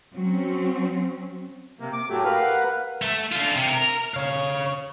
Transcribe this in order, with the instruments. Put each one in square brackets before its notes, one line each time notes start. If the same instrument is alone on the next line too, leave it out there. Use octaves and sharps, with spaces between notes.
[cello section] F#3 C4 C#4
[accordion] C3 A#3
D6
[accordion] A2 F#3 A3 [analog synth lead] G4
[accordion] A#4 B4 F5
[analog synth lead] F#5
[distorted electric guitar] A3
D3 F4
C3
A#4
[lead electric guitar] C#5 F5